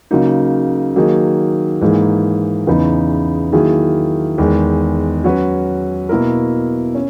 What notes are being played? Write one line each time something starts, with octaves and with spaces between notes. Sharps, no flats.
C#3 F#3 A#3 D#4
D#3 F#3 A#3 D#4 G#4
G#2 E3 A#3 D#4 G#4
E2 C#3 E3 B3 D#4
D#3 F#3 A#3 E4 G#4
E2 D#3 G#3
F#3 C#4 F#4 B4
B2 A#3 E4 A#4
C#4